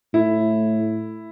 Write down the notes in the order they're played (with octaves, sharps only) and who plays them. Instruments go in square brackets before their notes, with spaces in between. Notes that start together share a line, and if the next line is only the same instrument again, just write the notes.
[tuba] A2 [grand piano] E4